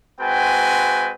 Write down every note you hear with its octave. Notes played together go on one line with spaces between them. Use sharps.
G#3 C4 F#4 B4 G5 G#5